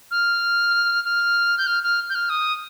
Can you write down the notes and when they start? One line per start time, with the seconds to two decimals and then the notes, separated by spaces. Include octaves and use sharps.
0.11 F6
1.04 F6
1.58 G6
1.67 F6
1.83 F6
2.10 G6
2.15 F6
2.29 D#6